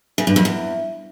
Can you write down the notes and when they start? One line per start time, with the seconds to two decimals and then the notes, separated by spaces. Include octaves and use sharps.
0.18 C#3
0.27 G2
0.36 F2
0.45 E2